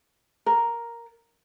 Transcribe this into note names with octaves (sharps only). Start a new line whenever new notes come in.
A#4